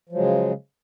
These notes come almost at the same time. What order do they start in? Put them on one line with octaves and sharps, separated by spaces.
F3 F#3 G#3 C#3